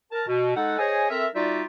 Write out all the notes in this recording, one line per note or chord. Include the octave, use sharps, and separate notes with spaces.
A#4 A5
B2
G#3 D#4 A4 F#5
G#4 C5 C#5 D#5 G#5
C4 A4 A#4 E5
G3 D#4 F4 F#4 D5 E5